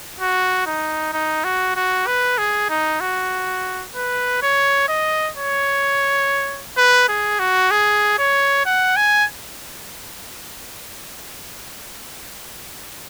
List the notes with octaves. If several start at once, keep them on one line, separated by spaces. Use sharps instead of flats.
F#4
D#4
D#4
F#4
F#4
B4
G#4
D#4
F#4
B4
C#5
D#5
C#5
B4
G#4
F#4
G#4
C#5
F#5
G#5